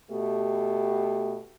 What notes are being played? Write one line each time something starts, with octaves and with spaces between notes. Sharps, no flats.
B2 A3 G4